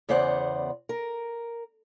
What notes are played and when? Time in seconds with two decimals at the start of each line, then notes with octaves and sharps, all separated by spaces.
0.09 E2 C#3 B3 C5 D5 F#5
0.89 A#4